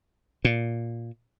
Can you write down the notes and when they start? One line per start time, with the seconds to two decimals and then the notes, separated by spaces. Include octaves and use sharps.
0.45 A#2